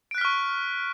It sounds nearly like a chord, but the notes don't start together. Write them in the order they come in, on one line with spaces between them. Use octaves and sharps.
D7 F#6 B6 F6 C#6